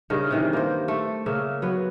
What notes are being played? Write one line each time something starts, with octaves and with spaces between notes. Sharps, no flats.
G2 C#3 D#4 A#4
C3 D#3 E3
A#3 C5
A3
C#3 A#3 E5
F#3 B3 B4